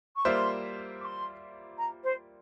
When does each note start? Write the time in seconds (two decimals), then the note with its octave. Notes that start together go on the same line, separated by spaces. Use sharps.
0.16 C#6
0.25 G3 A#3 F4 C5 E5 C6
1.01 D6
1.04 C6
1.78 A#5
2.04 C5